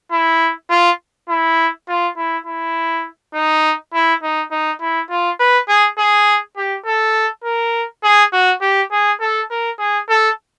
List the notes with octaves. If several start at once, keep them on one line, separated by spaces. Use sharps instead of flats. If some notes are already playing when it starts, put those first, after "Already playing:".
E4
F4
E4
F4
E4
E4
D#4
E4
D#4
D#4
E4
F4
B4
G#4
G#4
G4
A4
A#4
G#4
F#4
G4
G#4
A4
A#4
G#4
A4